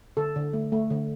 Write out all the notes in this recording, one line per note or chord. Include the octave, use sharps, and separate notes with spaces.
D3 A4
D3
A3
A3
D3